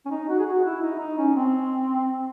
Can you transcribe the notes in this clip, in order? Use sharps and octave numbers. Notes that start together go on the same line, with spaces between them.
C#4
D#4
F#4
G#4
F#4
E4
D#4
D#4
C#4
C4